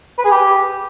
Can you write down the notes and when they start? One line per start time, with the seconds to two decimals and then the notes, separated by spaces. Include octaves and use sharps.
0.18 B4
0.25 G#4
0.31 G4